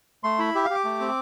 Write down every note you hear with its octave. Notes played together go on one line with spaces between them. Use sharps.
A3 C6
E4 B5
G4 E5
F5
G4 D6
A3
C4